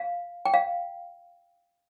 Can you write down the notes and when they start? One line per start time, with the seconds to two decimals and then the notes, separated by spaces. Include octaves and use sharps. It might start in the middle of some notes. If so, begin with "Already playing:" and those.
Already playing: F5
0.45 G5
0.54 F5